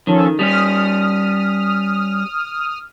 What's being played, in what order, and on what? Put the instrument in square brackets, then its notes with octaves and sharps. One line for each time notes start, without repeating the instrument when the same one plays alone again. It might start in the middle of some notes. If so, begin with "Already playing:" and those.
[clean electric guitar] D#3 [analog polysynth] F3 C#4 A4
[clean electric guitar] G3 C#4 [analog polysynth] D#6 F6